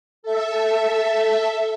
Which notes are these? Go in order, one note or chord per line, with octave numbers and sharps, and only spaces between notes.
A4 E5